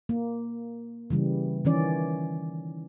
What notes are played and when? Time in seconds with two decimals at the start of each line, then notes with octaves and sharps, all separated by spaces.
0.09 A#3
1.10 C#3 E3 G3
1.65 D#3 E3 C#4 D5